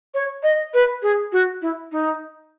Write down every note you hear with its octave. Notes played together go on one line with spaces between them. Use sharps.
C#5
D#5
B4
G#4
F#4
E4
D#4